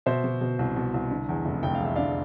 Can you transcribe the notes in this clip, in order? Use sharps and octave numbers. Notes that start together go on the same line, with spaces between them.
B2 C5 E5
B2
B2
C2
B2
C2
D3
E2
F1
F1 G5
F5
E2
E5
D3 D5 F5